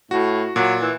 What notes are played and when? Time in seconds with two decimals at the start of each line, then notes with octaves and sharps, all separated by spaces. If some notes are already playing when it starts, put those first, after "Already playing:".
0.11 A2 F#4
0.56 A#2 F#3
0.81 E3